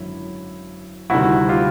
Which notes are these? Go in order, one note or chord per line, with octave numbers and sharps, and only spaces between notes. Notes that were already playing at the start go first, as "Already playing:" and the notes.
Already playing: G#1 F#2 D3 E4
D2 C3 D#3 G3 E4 F#4
F4 G4